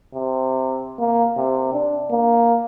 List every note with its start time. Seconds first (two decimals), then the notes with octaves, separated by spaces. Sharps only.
0.14 C3
0.99 A#3
1.37 C3
1.73 D4
2.11 A#3